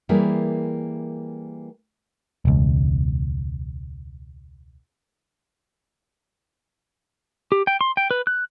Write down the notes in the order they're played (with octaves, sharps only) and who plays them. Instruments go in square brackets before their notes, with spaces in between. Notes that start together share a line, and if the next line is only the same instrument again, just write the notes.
[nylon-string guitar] E3 G3 A#3 E4 G#4 A#4
[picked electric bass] E1 C#2
[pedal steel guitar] G4
G5
C6
G5
B4
F#6